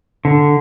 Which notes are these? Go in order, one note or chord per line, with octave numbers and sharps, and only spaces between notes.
D3